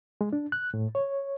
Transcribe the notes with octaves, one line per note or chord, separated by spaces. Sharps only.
G#3
D4
F#6
A2
C#5